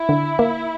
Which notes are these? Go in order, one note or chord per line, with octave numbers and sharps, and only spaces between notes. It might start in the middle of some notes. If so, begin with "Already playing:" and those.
Already playing: E4
D3
A#3